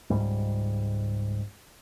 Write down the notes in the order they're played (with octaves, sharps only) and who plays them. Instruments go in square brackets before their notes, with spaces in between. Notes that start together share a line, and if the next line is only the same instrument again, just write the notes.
[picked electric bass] C#2 G#2 G3